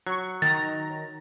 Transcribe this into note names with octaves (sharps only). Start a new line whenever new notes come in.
F#3 C#6
D#3 A#5 A6